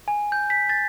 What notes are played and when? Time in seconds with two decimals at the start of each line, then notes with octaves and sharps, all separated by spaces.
0.08 G#5
0.32 G6
0.50 B6
0.69 A6